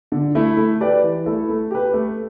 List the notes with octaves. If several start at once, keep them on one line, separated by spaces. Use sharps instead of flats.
D3
A3 E4
A3
G4 B4 D5
E3
A3 E4 A4
A3
G4 B4
A3